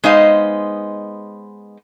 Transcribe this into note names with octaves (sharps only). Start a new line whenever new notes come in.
G#3 B3 D#4 C5 D#5 F5